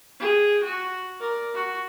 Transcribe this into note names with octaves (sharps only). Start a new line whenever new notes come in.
G#4 G5
F#4
A#4 D5
F#4